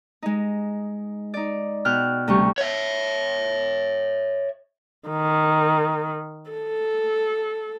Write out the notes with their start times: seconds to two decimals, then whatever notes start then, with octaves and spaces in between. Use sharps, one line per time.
0.22 G#3 D#4
1.34 D#4 D5
1.85 B2 G5 F6 F#6
2.28 D2 C3 G3 C#6
2.58 C#5 E5
5.09 D#3
6.51 A4